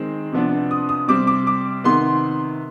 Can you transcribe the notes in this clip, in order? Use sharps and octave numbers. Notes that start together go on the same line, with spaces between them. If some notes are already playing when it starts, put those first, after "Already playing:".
Already playing: D#3 G#3 C4
C3 F3 B3 D4
D#6
D#6
C3 G3 C4 D6
D6
D6
C3 D#3 B3 C6